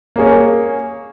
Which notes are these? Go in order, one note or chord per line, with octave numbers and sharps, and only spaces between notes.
A#3 C#4 G#4 C#5